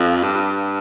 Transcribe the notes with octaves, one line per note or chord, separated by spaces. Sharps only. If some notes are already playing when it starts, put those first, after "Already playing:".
Already playing: F2
G2